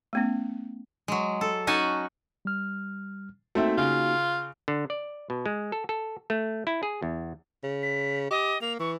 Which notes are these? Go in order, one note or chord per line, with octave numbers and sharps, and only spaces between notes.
A3 B3 C#4
F#3 G#3
A4
C#4 D#4 F#4 G#5 A5
G3 F6
A3 A#3 C4 D#4 F#4 E5
C#3 F4
D3
D5
B2
G#3
A4
A4
A3
E4
G#4
E2
C#3
B6
G4 D#5
A#3 F7
E3 C#6